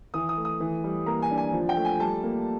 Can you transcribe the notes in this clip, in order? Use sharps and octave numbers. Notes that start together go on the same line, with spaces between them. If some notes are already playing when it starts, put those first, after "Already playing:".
E3 D#6
D#6
A3
D#6
E3
G3
A#3 A#5
G#5
D4
G#5
F3
G5
A3
G#5
G3 A5
A#3